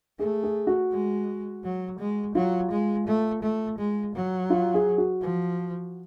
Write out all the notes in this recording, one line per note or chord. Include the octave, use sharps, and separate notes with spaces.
A3 G#4
G#4
F#4
G#3
F#3
G#3
F#3 F4
G#3
A3
A3
G#3
F#3
F4
G#4
F#4
F3